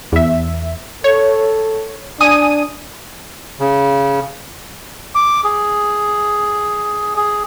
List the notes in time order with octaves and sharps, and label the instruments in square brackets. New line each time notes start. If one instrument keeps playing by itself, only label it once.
[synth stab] E2 E5
[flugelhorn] A4 [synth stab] C#5
[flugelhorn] D4 [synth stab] G#5 D#6 D#7
[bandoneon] C#3
[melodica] D6
G#4
G#4